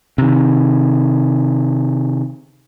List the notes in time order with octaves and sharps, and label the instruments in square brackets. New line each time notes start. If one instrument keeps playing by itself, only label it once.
[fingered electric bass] C3 D#3